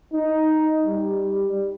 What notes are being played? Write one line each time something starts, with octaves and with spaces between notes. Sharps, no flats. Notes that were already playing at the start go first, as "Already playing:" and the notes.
D#4
G3